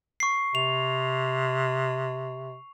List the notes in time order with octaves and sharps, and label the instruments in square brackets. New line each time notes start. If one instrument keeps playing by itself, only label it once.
[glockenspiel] C#6 C7
[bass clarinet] C3 [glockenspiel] F7